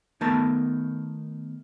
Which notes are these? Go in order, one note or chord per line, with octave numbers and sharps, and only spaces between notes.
D#3 A3 B3 A#4 A5